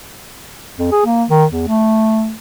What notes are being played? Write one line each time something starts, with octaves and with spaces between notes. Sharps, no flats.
F2
G#4
A#3
D#3
E2
A3